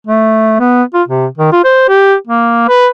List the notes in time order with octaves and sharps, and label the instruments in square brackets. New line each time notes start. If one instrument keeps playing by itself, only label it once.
[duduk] A3
B3
F4
C3
D#3
F4
C5
G4
A#3
B4